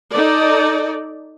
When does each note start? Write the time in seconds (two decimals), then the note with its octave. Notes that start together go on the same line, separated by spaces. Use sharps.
0.11 D#4 A4 D5